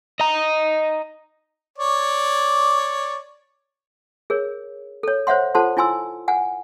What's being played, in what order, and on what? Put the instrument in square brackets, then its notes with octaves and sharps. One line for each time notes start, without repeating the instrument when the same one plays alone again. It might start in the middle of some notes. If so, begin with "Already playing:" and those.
[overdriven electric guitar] D#5 A#5
[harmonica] C#5 D5
[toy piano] G#4 A#4 C#5
A4 C#5
C5 C#5 E5 F#5 C6
F4 A4 C5 F#5 A5 C6
E4 F4 G#5 C6 E6
F#5 G#5